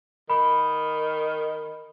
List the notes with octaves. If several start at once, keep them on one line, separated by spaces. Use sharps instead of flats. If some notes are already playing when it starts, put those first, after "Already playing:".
D#3 B5